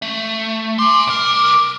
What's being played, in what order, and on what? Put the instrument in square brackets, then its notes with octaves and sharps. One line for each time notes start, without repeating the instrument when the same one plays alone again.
[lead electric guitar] A3
[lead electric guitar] G#5 C6 [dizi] D6
[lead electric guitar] C2 A#4